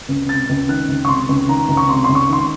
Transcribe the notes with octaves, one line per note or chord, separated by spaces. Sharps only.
C#2
C3 A6
C#2
D#3 F#6
C#2
C#6
C3 C6
C#2
D#3 A#5
C#2
C#6
C3 C6
C#2 C6
C#6
D#3 C6